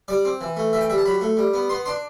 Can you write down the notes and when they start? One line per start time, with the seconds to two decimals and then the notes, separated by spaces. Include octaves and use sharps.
0.08 G3 D5
0.25 C4
0.41 E3
0.57 A3
0.73 E3 E5
0.81 G5
0.90 G3 E5
0.98 A5
1.06 F#3 B5
1.21 A3
1.37 G3
1.54 B3
1.69 B3 C6
1.86 D4 C6